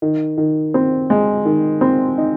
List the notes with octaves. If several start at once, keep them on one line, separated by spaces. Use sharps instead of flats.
D#3
D#3
C4
G#3
D#3
C4
D#4